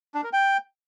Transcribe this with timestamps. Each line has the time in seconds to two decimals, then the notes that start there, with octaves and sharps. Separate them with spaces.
0.14 D4
0.24 A#4
0.33 G5